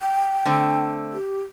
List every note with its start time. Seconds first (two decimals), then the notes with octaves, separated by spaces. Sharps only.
0.01 G5
0.45 D3 A3 C4
1.13 G4